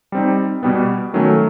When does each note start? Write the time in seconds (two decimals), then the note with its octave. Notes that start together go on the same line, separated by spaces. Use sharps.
0.12 G3 C4 D#4
0.63 B2 G3 B3
1.14 D#3 F#3 A3 C#4